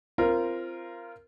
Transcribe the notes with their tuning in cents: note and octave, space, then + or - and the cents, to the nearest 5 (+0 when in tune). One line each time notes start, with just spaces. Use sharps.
C4 +0 F4 -20 A#4 +0